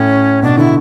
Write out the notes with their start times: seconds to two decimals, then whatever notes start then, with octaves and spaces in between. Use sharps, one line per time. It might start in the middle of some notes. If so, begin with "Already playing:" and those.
Already playing: A2 C#4
0.43 B2 D4
0.58 D3 E4